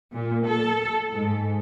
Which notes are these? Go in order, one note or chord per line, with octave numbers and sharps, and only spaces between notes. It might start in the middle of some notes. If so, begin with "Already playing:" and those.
A#2
A4
G#2